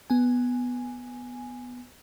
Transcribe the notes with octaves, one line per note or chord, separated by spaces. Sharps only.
B3 G#5